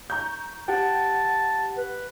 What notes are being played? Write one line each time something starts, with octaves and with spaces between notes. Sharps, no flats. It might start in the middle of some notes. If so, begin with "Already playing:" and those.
A#5 C#6 G6
G4 F#5 G5 A5
B4